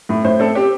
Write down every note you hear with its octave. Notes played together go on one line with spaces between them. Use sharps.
A2
A2 C5
C4 A4
C4 G4